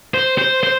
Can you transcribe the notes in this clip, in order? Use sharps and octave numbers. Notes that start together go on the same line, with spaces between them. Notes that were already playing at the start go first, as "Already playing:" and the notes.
C5
C5
C5